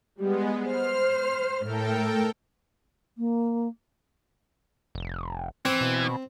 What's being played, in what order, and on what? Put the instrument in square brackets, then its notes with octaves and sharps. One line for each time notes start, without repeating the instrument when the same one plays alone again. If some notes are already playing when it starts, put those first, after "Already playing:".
[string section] G3 [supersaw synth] G#3 B3
[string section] C5 [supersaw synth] F6
[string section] A2 [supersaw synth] A4 A#4 G5
[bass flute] A#3
[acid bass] F1
[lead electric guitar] E3 [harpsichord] C4
[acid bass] B2